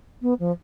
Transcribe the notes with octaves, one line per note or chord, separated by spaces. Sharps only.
B3
F3